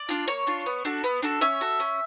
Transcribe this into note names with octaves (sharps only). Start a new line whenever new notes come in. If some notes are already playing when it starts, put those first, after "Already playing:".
Already playing: D5
D4 F4
A#3 C#5
D4 F4
B3
D4 F#4 A4
B3
D4 F#4 A4
C#4 E5
F#4 A4
C#4